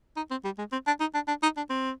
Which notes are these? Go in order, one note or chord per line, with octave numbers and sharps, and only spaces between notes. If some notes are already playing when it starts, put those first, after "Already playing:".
D#4
C4
G3
G#3
C4
D4
D#4
D4
D4
D#4
D4
C4